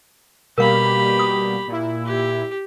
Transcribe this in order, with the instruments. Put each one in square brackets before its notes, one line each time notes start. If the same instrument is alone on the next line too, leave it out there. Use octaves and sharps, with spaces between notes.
[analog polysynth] B2 G3 A#3 [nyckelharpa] G4 B5 [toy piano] A#4 F5
[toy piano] D#6
[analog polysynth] A#2 E4
[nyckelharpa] G4